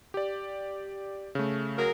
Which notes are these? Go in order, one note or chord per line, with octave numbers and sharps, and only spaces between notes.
G4 D5
C#3 A3
F#3 G#4 A#4